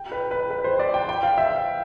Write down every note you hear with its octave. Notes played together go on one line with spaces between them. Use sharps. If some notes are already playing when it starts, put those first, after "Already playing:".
Already playing: G5
B4
B4
B4
C5
D5
G5
G5
F5
E5